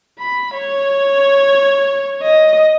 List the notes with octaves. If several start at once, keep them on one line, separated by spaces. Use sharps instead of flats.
B5
C#5
D#5